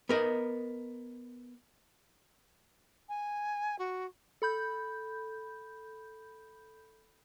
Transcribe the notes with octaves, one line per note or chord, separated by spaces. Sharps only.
B3 A#4 D#5
G#5
F#4
A4 B5 G6